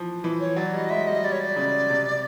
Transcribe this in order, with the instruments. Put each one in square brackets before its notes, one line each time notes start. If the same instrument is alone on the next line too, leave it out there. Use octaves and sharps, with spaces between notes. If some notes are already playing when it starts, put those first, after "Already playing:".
Already playing: [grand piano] E3 F3
E3
[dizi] C#5
[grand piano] F#3 [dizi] D5
[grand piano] G3 [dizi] D#5
[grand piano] G#3 [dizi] E5
[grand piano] G3 [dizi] D#5
[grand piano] G3 [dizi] D5
[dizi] C#5
D5
[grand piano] C#3
C3